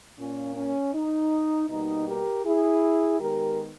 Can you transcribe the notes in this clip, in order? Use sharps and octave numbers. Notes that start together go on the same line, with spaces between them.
A#2 A#3 C#4
C#4
D#4
B2 G3 A#3 D#4
G4 A#4
E4 G#4
D#3 G#3 B3 G4 A#4